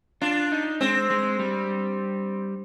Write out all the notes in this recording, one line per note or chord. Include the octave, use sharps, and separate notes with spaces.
D4 F4
D#4
G#3 C4
G#3
G3